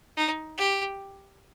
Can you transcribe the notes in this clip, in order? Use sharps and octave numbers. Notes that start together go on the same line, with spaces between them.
D#4
G4